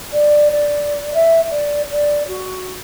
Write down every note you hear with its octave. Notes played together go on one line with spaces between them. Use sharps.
D5
D5
E5
D5
D5
F#4